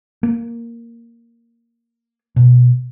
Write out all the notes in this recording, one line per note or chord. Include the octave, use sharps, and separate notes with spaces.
A#3
B2